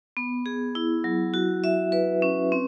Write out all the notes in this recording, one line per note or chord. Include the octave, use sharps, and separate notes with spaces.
B3
G#4
E4
F#3
F#4
E5
B4
C#4
C4